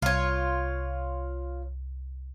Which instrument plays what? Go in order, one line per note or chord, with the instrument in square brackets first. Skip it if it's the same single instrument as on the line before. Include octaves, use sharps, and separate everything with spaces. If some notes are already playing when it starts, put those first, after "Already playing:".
[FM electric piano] C2 [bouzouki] F4 C#5